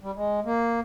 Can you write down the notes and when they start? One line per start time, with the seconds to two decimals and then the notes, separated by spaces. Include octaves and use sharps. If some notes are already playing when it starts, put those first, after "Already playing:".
0.01 G3
0.16 G#3
0.45 A#3